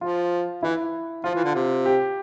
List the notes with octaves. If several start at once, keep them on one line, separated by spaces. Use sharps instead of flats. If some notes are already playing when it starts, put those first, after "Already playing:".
F3 F4
E3 E4
F3 F4
E3
D3
C3
G4